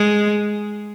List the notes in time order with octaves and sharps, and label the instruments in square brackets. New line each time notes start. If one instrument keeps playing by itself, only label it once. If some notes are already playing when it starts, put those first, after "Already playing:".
Already playing: [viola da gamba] G#3